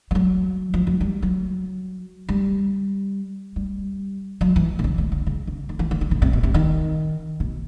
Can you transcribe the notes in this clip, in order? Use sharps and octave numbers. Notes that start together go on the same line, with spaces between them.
G3
F#3
F3
F#3
G3
F#3
G3
G3
F#3
E3
C3
C#3
D3
D3
C#3
C#3
D3
E3
D#3
D3
C3
C3
B2
C3
D#3
B2